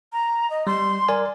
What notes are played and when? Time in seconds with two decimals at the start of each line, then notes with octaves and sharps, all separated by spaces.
0.13 A#5
0.50 D#5
0.67 G3 C6
1.09 A#4 D5 G#5